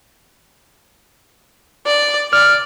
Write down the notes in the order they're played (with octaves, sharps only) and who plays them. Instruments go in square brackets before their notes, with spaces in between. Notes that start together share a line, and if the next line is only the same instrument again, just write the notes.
[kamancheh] D5
[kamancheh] D5 [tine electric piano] F6